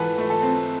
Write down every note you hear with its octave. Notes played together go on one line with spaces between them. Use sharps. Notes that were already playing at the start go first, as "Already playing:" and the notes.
Already playing: G#2 E3 A4 B4
A3
A4
C4